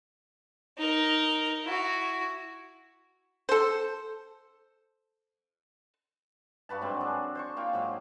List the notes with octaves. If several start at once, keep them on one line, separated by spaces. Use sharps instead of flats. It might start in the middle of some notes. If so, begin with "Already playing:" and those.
D#4 A#4
E4 F#4
A4 C5
G2 F#4 B4 A5
G#2 F#3 C4
D4 G#4 A4
C5 C6 C#6
A#3 F4 F5 G5
G#2 F#3 C6